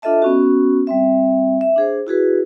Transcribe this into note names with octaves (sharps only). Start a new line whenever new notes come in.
D4 F4 A4 D#5 E5 A5
B3 C#4 F#4
G3 C4 E5
E5
D4 G#4 C5
E4 F#4 G#4 B4